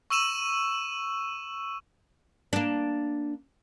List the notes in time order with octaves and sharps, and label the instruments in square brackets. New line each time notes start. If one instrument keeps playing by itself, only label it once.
[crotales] C#6 E6 D#7 E7 F#7
[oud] A#3 D4